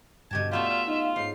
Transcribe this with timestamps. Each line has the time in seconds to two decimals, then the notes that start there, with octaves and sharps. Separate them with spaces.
0.31 G2 B2 D3 G4 A5 G#6
0.51 A3 B3 F4 G4 D5 E5
0.69 F4
0.87 D#4 F4 D#5 F5
1.16 G#2 C#5 C7